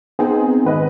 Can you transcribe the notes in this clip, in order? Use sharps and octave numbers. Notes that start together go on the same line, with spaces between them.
B3 C4 D#4 G#4
G#1 B4 D#5